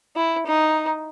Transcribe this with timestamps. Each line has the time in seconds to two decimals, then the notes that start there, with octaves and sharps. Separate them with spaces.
0.16 E4
0.46 D#4